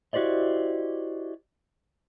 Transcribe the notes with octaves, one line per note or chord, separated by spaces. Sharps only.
E4 F#4 G4 C5 D5 D#5